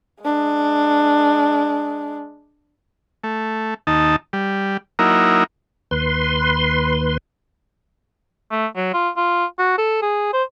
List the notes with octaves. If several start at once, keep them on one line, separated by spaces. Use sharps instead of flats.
G#3 D4
A3
D#2 D#4 A5
G3
F#3 A#3 D#4 E4 A#4
D#2 B4 C6
A3
F#3
F4
F4
F#4
A4
G#4
C5